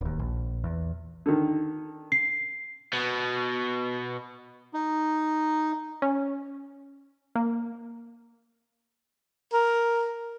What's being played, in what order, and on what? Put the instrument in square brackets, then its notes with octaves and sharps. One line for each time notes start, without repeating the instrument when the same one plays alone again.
[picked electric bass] D1 D#2
A#1
E2
[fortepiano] D3 D#3
[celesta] C7
[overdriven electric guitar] B2
[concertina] D#4
[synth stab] C#4
A#3
[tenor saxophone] A#4